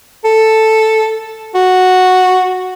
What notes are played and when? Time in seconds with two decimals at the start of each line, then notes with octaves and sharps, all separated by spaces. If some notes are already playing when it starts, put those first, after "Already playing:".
0.25 A4
1.55 F#4